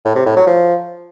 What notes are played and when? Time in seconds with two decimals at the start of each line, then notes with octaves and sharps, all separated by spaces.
0.05 A2
0.16 C3
0.26 A2
0.37 F#3
0.47 F3